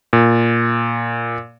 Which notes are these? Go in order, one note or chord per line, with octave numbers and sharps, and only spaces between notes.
A#2